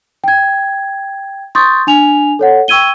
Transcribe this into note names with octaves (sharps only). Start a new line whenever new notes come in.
G5 G#6
C6 C#6 D#6 G6 A6
D4 G#5 F7
A4 C#5 F#5
G5 C#6 E6 G#6 D#7 G7